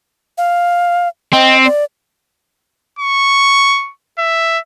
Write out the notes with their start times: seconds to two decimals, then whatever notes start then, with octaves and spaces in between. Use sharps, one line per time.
0.38 F5
1.33 C4 D#5
1.65 D5
2.99 C#6
4.19 E5